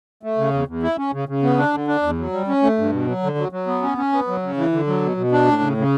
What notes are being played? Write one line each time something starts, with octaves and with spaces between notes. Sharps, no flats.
A3
C#3
E2
E2
E4
C#4
C#3
C#3
B3
D4
D3
D4
E2
F#3
G3
C#4
A3
G2
B2
F#3
D3
F#3
F#3
B3
C#4
C#4
B3
F#3
C#3
E3
D3
F#3
B2
B2
D4
A2
C#3
C#3